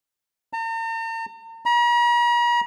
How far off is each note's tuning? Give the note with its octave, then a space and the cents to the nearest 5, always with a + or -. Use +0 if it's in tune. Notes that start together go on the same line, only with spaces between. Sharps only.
A#5 -45
A#5 +45